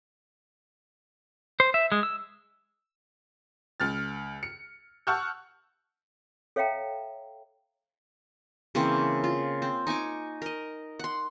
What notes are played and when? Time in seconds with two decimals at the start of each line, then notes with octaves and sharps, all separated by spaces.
1.60 C5
1.74 E5
1.92 G#3
2.03 E6
3.80 C#2 F6 A6
4.43 C#7
5.07 F#5 A5 C#6 E6 F6 G6
6.56 A4 C#5 E5 F5 G5 A#5
8.75 C#3 E3 A#3 C4
9.24 F4
9.62 C4
9.87 D#4 G#5 C#6 D6
10.42 A#4 D#5
10.99 F#5 C6